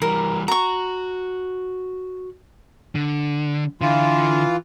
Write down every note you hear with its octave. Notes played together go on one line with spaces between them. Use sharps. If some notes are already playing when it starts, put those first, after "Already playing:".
E3 G3 A#4
F#4 A#5 C#6
D3
D3 E3 F4